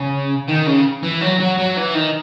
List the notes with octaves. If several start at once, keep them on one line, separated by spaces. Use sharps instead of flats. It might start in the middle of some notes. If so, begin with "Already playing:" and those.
Already playing: C#3
D#3
C#3
E3
F#3
F#3
F#3
E3
D#3